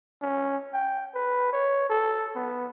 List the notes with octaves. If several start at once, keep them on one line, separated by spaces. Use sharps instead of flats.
C#4
G5
B4
C#5
A4
B3